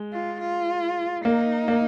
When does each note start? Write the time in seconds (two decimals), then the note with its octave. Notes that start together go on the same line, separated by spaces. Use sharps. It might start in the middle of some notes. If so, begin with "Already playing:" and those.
Already playing: G#3
0.13 F4
0.40 F4
1.25 A#3 D#4
1.68 A#3